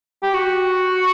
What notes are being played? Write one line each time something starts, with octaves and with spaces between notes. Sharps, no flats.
G4
F#4